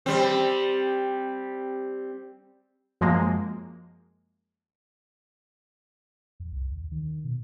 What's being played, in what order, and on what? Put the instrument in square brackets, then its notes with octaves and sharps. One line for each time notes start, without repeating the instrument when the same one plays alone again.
[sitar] G3 C4
[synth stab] F#2 F3 G#3 A#3
[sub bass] F2
C2
D#2
D#3
B2